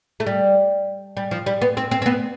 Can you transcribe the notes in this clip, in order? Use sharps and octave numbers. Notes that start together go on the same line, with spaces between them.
A3
G3
G3
F3
G3
B3
C4
C4
C4
B3